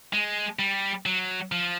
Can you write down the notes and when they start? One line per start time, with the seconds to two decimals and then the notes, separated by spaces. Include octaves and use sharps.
0.13 G#3
0.59 G3
1.06 F#3
1.52 F3